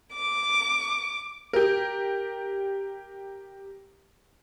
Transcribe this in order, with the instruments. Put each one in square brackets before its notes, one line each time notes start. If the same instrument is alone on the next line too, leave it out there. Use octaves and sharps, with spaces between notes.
[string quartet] D6
[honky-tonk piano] G4 A#4